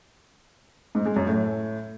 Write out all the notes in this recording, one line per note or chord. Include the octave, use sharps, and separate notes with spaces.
G#2
G#3
F#2
A2